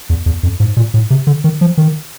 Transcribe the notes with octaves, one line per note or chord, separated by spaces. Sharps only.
E2
E2
F2
G#2
A#2
A2
C3
D3
D#3
F3
D#3